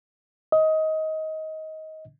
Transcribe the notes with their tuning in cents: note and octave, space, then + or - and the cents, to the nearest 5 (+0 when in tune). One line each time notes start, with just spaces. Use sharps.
D#5 +20